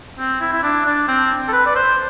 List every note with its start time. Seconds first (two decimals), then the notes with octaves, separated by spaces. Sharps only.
0.19 C4
0.41 E4
0.52 E4
0.63 D4
0.85 D4
1.08 C4
1.48 A4
1.52 B4
1.66 D5
1.75 C5